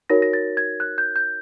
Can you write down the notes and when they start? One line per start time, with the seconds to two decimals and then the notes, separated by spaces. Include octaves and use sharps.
0.10 D#4 F#4 A#4 C#5 A#6
0.22 A#6
0.33 A6
0.57 G#6
0.80 F#6
0.98 G6
1.16 G6